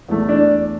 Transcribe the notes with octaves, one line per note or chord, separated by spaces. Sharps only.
E2 E3 A3
D4